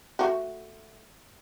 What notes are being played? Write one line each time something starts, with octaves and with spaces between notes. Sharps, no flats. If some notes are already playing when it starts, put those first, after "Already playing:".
A3 F4 F#4